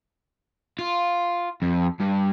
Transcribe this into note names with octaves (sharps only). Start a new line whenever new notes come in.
F4
F2
G2